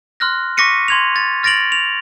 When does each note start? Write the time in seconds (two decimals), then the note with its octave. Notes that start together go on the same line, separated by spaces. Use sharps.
0.20 C6 F6 F#6 A#6
0.57 C#6 D6 A#6 B6 C#7 D#7
0.88 C6 G#6 F7
1.16 A6
1.43 F6 A6 A#6 D7 F7 F#7
1.72 F7